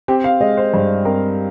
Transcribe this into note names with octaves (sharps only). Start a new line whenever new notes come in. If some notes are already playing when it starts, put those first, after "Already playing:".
C4 G4
F5
G#3 D#5
C5
G2 C5
C4 A#4